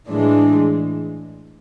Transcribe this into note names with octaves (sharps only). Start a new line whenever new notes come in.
A2 E3 G#3 D4